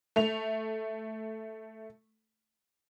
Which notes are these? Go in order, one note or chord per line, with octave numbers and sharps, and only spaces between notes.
A3 F7